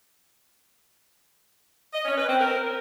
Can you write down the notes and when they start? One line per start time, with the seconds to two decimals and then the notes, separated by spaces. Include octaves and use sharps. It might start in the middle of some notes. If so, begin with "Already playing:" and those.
1.94 D#5
2.05 C#4
2.17 B4
2.28 C4
2.40 A#4